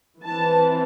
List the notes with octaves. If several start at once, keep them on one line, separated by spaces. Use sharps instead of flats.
E3 C4 A5